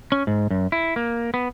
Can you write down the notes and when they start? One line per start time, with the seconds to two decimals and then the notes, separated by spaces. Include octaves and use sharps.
0.12 C#4
0.27 G#2
0.51 F#2
0.72 E4
0.96 A#3
1.34 B3